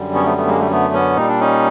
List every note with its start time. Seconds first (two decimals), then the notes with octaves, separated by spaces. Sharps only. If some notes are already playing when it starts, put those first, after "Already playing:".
Already playing: F#2 D3 G3
0.15 B3 C#4
0.26 A3 B3
0.37 A3 B3
0.48 G#3 A#3
0.60 G3 A3
0.71 A3 B3
0.94 B3 C#4
1.16 A#2 G3 D#4
1.28 D4
1.40 C#4 D#4